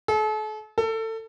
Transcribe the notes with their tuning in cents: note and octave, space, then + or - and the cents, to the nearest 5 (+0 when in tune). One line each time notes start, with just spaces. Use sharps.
A4 -40
A4 +25